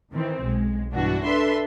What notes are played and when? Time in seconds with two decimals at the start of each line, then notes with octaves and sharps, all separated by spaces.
0.13 D#3 E3 C4
0.43 B1 G#3
0.93 G2 B2 E3 D4 F#4
1.25 D4 A4 B4 E5 C6